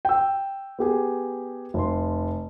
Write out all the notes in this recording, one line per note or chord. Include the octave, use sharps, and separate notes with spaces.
G5 E6
B3 G4 G#4
F1 C6